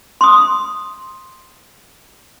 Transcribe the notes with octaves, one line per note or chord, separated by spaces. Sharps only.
C6 D#6